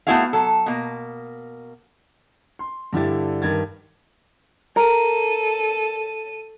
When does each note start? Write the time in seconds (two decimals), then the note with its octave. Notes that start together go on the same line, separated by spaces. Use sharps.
0.07 A3 B3 E4 F#4 G#4 F5
0.33 F#3 A4
0.66 B2 A#3
2.59 C6
2.93 G2 D3 E4 G4 A6
3.42 G2 D#3 G#6 A6
4.76 A4 A#4 D#7